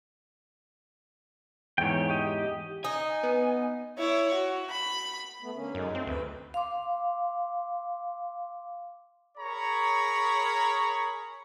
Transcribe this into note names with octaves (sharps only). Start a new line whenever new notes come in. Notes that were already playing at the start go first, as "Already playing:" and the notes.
E2 G#2 C#5 G5
G4 D#5
D#4 G#5
B3
E4 C#5
F#4
B5
A3 B3
D3 A#3 C#4
F#2 G#3 D#4
G2 A3 C4
D2 B4
F5 C6 D6
G#4 A#4 C#5 A#5 B5 C#6